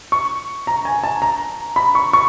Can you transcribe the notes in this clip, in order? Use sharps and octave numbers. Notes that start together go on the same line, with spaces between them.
C#6
A#5
G#5
A5
A#5
B5
C#6
C#6